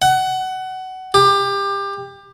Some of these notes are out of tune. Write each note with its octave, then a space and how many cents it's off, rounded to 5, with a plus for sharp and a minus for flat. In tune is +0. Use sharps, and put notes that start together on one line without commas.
F#5 +20
G4 +25